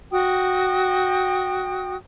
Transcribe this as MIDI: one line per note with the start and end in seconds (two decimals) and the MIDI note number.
0.11 1.95 66
0.11 1.95 75
0.11 1.95 79
0.11 1.95 87